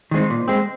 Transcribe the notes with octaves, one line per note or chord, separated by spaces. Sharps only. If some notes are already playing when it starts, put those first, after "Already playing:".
D#3 G#3 C4 D#4
A#2
G#3 C4